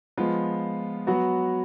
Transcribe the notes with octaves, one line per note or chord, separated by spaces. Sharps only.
F3 G#3 B3 F4
F#3 B3 F#4